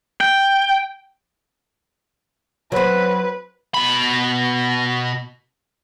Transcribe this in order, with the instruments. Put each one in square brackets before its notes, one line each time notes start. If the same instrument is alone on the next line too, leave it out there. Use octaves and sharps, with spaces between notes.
[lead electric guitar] G5
[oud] F#3 C4 [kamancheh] B4
[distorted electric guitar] B2 B5